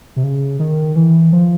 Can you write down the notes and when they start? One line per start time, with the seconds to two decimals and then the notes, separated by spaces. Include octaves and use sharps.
0.16 C3
0.23 C#3
0.59 D#3
0.96 E3
1.33 F3